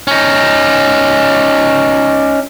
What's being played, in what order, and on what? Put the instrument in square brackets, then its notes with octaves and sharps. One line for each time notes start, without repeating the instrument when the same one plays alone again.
[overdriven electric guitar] C#4 D#4